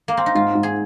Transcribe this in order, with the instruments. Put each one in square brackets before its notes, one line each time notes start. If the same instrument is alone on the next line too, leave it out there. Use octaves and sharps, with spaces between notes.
[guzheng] A#3
C4
D#4
[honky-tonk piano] G#2 [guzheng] F4
[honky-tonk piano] G#2
[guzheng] G#4